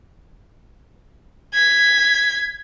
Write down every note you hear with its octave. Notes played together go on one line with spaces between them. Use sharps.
G#6 B6